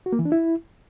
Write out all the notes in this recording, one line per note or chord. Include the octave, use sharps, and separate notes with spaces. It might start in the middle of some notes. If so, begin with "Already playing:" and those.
F#4
A#3
E3
D4
E4